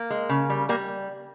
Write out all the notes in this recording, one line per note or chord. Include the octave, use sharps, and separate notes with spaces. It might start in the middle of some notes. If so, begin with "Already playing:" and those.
Already playing: A#3
G#3
C#3
G3
G3 A#3